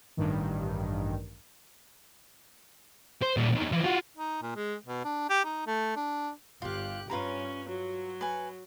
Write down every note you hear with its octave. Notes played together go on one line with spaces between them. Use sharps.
A1 G2 D#3
C5
A#2 G3
E2 D#3
E3 F3
F4 F#4
D#4
A#2
G#3
B2
D4
G4
D#4
A3
D4
G1 F4 G4 F5 F#6
G2 C#4 F4 B4 A#5
F#3
B4 G#5